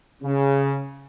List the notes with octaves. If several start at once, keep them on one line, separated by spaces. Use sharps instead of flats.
C#3